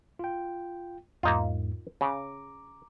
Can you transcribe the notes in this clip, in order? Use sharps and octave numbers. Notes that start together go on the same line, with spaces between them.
F4 G5
E2 G#2 A#3 D#4 F4
C#3 A#5 D6